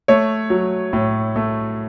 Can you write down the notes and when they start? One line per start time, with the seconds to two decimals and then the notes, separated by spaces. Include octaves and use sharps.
0.08 A3 C#5
0.50 F#3
0.93 A2
1.36 A3